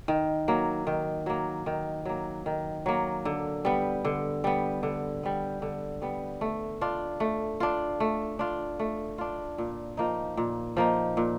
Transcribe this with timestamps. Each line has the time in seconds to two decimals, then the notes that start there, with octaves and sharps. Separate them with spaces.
0.08 D#3
0.48 F#3 A#3
0.87 D#3
1.26 F#3 A#3
1.66 D#3
2.05 F#3 A#3
2.46 D#3
2.86 F#3 A#3
3.25 D3
3.65 G3 B3
4.05 D3
4.44 G3 B3
4.83 D3
5.23 G3 B3
5.62 D3
6.02 G3 B3
6.41 A3
6.81 D4 F4
7.20 A3
7.60 D4 F4
8.00 A3
8.39 D4 F4
8.79 A3
9.18 D4 F4
9.58 A#2
9.97 F3 A#3 D#4
10.37 A#2
10.77 F3 A#3 D#4
11.17 A#2